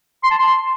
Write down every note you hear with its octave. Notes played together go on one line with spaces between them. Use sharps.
C6
A5
C6